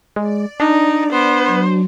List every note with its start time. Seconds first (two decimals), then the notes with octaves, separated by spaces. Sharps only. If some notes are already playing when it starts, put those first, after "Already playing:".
0.16 G#3 D5
0.60 D4 D#4
1.13 B3 C5
1.46 F#3